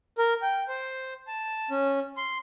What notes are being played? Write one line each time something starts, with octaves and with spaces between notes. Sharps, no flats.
A#4
G5
C5
A5
C#4
C6